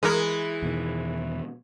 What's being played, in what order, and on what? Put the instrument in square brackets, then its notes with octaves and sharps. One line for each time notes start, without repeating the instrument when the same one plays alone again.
[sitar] E3 E4 [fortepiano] G#3 [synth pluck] A#4 D#6
[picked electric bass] E2 B2 D#3